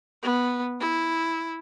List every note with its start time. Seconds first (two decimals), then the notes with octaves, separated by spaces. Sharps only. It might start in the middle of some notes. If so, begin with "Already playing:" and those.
0.23 B3
0.80 E4